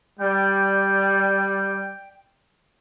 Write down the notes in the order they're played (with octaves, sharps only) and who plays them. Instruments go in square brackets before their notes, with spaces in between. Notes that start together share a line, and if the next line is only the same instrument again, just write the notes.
[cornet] G3 [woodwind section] D5 G5